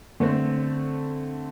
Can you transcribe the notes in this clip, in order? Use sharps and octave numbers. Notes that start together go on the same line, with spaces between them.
D3 A3 C4